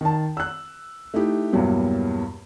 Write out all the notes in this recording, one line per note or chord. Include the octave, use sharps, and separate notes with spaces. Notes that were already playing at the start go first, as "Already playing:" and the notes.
D#3 A5
E6 F#6
A3 D#4 E4 G4
E2 G2 B2 F#3 G3 A#3